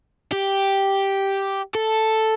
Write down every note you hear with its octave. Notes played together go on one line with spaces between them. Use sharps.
G4
A4